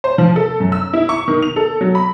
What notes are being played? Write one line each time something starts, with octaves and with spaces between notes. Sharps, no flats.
C5
F3
A4
F#2
E6
E4
C#6
D#3
F7
A4
F#3
B5